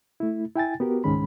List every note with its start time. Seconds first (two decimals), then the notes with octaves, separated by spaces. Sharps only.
0.20 A3 E4
0.56 E4 G5 G#5 A6
0.80 B3 F#4 G4 A#4
1.04 C#2 G#2 D#3 G#3 C#4 B5